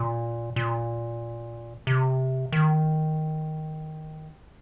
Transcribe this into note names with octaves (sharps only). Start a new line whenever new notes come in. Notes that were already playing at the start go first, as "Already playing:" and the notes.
Already playing: A#2
A#2
C3
D#3